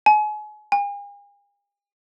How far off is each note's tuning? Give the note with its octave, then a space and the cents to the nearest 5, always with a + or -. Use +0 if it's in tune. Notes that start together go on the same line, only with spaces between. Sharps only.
G#5 +35
G#5 -45